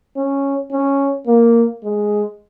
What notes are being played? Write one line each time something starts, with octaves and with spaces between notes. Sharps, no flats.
C#4
C#4
A#3
G#3